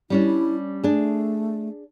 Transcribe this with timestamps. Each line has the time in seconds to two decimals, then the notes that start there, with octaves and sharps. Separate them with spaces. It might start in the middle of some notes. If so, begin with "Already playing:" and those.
0.10 G3 C#4 D4 E4
0.83 A3 D4 G#4